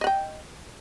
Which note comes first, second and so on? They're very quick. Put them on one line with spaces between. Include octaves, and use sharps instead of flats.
D#5 F#5 G5